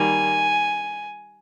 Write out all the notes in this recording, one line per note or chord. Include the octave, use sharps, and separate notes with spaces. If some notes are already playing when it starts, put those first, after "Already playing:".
Already playing: D#3 G3 A#3 G#5